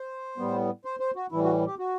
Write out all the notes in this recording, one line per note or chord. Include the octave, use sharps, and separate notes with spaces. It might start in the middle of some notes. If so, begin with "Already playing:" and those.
Already playing: C5
A2 G3 B3
C5
C5
F#4
A2 E3 G3 E4
F#4
G4
F#4